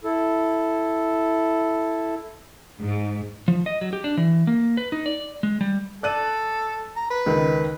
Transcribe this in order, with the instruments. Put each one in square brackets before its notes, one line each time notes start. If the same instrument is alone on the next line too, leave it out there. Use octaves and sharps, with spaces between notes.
[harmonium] E4 A4
[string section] G#2
[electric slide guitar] F3
D#5
F#3
G4
D4
E3
A#3
B4
D#4
D5
G#3
G3
[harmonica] A4 [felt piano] D5 F#6 D#7
[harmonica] A#5
B4
[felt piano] C#2 D#3